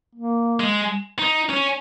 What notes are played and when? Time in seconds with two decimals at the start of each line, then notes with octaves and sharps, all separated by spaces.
0.15 A#3
0.60 G#3
1.19 D#4
1.50 C#4